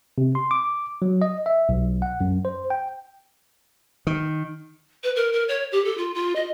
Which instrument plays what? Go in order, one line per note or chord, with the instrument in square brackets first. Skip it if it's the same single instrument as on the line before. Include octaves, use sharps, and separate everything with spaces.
[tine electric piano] C3
C6
D6
F#3
D#5
E5
B1
F#5
F#2
C5
G5
[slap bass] D#3
[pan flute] B4
A#4
A#4
C#5
G4
A4
F4
F4
D#5